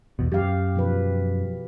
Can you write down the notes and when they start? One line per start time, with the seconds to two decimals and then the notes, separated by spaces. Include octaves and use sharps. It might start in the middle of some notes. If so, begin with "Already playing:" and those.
0.19 E2 B2
0.32 F#2 G4 F5
0.75 B2 F3 B4